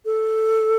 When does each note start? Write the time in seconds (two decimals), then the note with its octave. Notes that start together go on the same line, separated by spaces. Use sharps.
0.05 A4